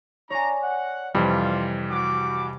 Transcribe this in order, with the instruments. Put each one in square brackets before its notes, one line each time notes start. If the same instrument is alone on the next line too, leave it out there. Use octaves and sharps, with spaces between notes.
[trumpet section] D4 A#5 [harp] C#5 D5 G#5
[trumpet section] F#5
[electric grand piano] F2 E3 G3 [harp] C3 [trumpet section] F4 F5
[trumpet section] F#4 D6 [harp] G4 F#6